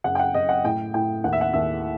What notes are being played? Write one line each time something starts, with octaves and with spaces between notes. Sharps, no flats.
F#1 F#5
G5
F#5
F#1 D#5
F#5
A2 G5
A2 G5
D#2 F#5
E5
F#5
D#2 E5